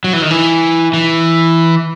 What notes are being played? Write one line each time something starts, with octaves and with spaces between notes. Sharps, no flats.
F#3
E3
D#3
E3
E3